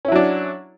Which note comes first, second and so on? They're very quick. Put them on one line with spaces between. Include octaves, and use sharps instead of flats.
C#4 E4 F#3 D4